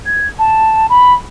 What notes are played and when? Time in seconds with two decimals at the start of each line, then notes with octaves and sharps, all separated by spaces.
0.06 G#6
0.39 A5
0.90 B5